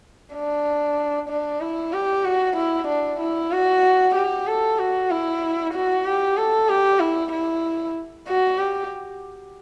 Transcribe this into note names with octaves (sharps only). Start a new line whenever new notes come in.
D4
D4
E4
G4
F#4
E4
D4
E4
F#4
G4
A4
F#4
E4
F#4
G4
A4
G4
E4
E4
F#4
G4